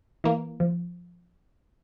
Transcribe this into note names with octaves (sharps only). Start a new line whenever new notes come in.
E3 A#3
F3